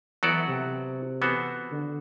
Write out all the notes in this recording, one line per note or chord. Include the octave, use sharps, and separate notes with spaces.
E3 F#3 B3 F#4 A4 D5
C3
E3 B3 F#4 A4 C5
D3